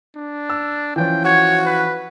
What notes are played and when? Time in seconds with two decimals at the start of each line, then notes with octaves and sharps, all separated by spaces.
0.16 D4
0.50 E6
0.96 E3 F3 C#4 G5
1.25 F#4 C#5
1.66 B4